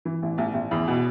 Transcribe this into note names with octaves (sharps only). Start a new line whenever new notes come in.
E3
A1
A1
A1
E2
B2